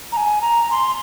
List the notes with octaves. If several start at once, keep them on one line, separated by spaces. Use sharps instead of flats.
A#5
G#5
A#5
C6